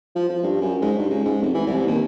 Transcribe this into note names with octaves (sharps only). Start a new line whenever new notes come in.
F3
F3
G2
F#2
G#2
G2
C#2
G#2
F1
E3
C2
D#2